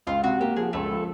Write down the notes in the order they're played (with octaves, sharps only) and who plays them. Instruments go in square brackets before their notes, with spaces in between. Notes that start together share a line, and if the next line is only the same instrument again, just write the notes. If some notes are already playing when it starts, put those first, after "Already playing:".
[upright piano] C#2 [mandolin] F4
[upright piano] C3 [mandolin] F#4
[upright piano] A#3 [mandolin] G4
[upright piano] F3 [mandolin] G#4
[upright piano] C#2 [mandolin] A3 A4
[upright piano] F3